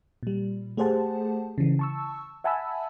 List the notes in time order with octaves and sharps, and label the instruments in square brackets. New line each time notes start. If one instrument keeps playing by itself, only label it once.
[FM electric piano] A#2 G3
A3 G4 G#4 C5 F#5 A5
C#3 E3
A5 C#6 E6
E5 F#5 G#5 A5 B5 E6